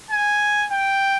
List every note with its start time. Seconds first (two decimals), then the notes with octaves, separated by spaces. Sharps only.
0.11 G#5
0.72 G5